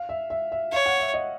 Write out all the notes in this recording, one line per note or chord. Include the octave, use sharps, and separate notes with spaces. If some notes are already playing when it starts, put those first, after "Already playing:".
Already playing: F5
E5
E5
E5
C#5 F5
F#5
E5
D#5